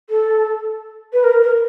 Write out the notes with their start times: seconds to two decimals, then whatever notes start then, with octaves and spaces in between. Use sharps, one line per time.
0.09 A4
1.13 B4
1.24 A#4
1.43 A#4